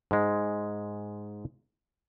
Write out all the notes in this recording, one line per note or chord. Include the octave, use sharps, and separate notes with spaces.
G#2 G#3